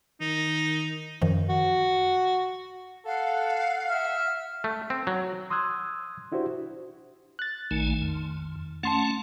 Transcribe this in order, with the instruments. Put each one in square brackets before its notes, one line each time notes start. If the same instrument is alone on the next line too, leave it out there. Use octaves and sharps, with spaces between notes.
[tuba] D#3 [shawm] D#4
[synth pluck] F#2 D#3 F3
[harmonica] F#4
[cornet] A4 [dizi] F5 [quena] F#5
[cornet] E5 [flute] F6
[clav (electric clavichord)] A3
C4
F#3
[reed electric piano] C6 D#6 E6 F#6 G#6
D4 E4 F#4 G4 C5
[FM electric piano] F#6 A6
[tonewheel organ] A#1 A3 G#5 [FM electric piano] D#3
[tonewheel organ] F2
[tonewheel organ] A3 C#4 F#5 [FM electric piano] A5 C6 A6